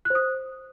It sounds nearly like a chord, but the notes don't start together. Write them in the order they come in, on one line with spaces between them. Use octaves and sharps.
F#6 C5 D#6